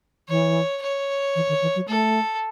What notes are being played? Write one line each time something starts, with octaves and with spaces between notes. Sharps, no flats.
E3 C#5
C#5
E3
D#3
E3
F#3
A3 A4